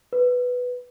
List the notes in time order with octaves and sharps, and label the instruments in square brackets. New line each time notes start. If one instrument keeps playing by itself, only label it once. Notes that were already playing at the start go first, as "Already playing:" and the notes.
[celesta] B4